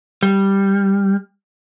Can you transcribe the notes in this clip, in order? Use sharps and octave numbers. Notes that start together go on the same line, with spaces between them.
G3